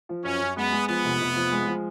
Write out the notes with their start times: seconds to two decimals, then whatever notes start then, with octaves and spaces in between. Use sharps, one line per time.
0.09 F3
0.24 F#2 C#4
0.41 F#2
0.57 G#3 B3
0.73 G#3
0.88 F3 B3
1.05 F1
1.21 F1
1.36 F3
1.51 G#3
1.68 F3